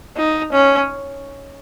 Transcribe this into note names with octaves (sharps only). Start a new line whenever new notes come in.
D#4
C#4